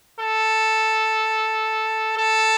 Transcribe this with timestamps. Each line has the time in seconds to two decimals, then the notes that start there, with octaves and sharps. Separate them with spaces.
0.20 A4
2.17 A4